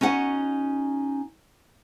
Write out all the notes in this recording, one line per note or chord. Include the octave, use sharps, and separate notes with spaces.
C#4 D#4 F#4 F#5